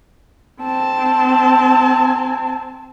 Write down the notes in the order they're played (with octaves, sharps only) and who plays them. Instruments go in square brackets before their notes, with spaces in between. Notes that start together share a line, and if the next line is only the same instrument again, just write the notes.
[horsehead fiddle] C4 A5